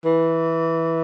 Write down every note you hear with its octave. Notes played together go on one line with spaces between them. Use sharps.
E3